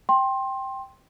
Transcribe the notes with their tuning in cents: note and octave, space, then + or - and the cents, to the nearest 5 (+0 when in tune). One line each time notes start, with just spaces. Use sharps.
G5 +0 C6 +20